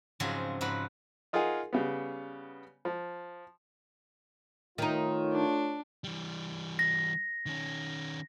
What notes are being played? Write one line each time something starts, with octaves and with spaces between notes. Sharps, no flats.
G#2 C#3 F3 F#3 C4 G#4
G#2 F3 F#3 B4 B5
D#4 F4 G#4 A#4 F#5 G#5
C#3 G3 B3
F3
D#3 A3 D#4 F4 C#5
D4
E3 G3
A#6
D#3 C#4